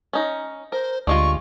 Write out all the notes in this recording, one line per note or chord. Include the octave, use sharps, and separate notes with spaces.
C#4 D#4
A#4 C5
D2 G3 G#3 F4 C#6